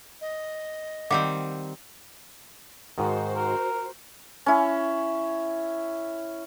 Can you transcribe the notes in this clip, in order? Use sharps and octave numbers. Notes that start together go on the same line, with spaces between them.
D#5
D#3 G3 C4 F5 F#5 D6
G#2 D#3 F#4 C5
A#4
C#4 E4